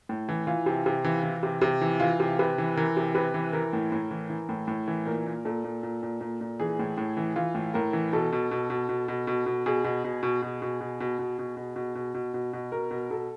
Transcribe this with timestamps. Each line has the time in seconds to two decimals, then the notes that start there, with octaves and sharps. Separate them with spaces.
0.09 A2
0.29 E3
0.47 E3 F4
0.66 C3
0.86 C3
1.04 E3
1.23 E3
1.43 C3
1.61 C3
1.81 E3
2.00 E3 F4
2.20 C3
2.39 C3 B4
2.58 E3
2.77 E3 A#4
2.97 C3
3.14 C3 B4
3.34 E3
3.53 E3 A#4
3.73 A2
3.92 A2
4.11 E3
4.30 E3
4.49 A2
4.68 A2
4.88 E3
5.06 A#2 A#4
5.26 A#2
5.45 A#2 A4
5.64 A#2
5.83 A#2
6.03 A#2
6.21 A#2
6.41 A#2
6.60 E3 G#4
6.79 A2
6.98 A2
7.17 E3
7.36 E3 F4
7.55 A2
7.74 A2 A#4
7.93 E3
8.13 B2 A4
8.32 B2
8.51 B2
8.70 B2
8.89 B2
9.08 B2
9.27 B2
9.46 B2
9.66 B2 G#4
9.84 B2
10.04 B2
10.23 B2
10.42 B2
10.62 B2
10.81 B2
11.00 B2
11.19 B2
11.39 B2
11.57 B2
11.76 B2
11.95 B2
12.14 B2
12.34 B2
12.53 B2
12.72 B2 A#4
12.91 B2
13.10 B2 A4